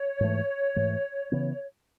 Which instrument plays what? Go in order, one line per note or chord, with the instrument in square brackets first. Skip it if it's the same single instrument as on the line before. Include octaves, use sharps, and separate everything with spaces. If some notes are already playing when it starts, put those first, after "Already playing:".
Already playing: [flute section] C#5
[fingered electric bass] G#2 E3 A3
G#2 E3 A3
C#3 E3 B3